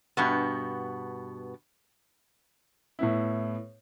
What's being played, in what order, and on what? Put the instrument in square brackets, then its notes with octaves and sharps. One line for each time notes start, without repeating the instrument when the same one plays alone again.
[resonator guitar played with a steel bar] G2 B2 B3
[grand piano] A2 B3 E4